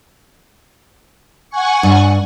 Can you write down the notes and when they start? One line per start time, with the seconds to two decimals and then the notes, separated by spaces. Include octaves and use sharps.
1.50 F#5 G#5 C#6
1.83 G2